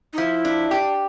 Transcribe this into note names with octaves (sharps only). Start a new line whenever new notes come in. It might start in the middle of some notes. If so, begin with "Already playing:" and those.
D#4
F3 E4
D4
G4